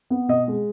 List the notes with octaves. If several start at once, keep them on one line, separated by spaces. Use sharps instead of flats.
B3
B2 D#5
G#3